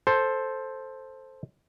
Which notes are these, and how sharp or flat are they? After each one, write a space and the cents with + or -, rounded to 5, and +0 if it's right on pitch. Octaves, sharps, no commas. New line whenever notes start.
A4 +0 C5 +5